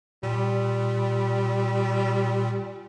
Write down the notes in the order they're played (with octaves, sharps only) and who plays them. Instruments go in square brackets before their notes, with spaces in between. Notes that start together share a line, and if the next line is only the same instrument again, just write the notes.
[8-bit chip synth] A#2 [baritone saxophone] G3